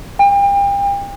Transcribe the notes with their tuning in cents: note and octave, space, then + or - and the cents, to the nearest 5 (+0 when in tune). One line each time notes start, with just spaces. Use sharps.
G5 +35